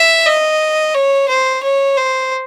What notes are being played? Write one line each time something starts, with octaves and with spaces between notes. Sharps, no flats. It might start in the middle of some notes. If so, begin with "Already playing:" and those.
Already playing: E5
D#5
C#5
C5
C#5
C5